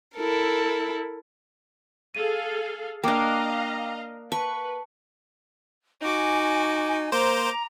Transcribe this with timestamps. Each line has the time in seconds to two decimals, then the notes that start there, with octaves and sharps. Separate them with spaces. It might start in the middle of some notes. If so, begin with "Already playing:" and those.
0.15 E4 A4 A#4
2.15 G#4 A4 F5 D#7
3.04 A#3 D4 D#5 F5 G5 A#5 D6
4.32 B4 A5 C#6
6.02 D#4 F#4 G#5 D6
7.12 A#3 C5 A#5 D6